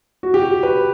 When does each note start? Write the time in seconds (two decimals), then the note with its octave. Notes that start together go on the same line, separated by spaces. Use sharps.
0.23 F#4
0.34 G4
0.44 F#4
0.63 B4